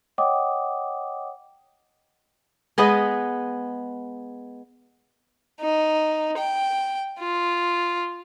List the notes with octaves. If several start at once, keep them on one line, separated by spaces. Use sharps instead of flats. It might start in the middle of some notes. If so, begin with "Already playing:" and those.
C#5 D#5 F#5 G5 D6 D#6
G#3 B3 B4 D#5
D#4
G5
F4